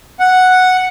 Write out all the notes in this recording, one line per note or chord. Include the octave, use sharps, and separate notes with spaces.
F#5